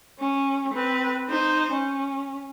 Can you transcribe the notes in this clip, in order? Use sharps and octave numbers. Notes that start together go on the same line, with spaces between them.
C#4
C4 B4
D#4 C5
C#4